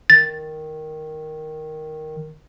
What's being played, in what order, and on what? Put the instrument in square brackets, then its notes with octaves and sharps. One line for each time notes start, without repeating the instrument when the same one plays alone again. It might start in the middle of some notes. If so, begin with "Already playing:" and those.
[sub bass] D#3 [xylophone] A6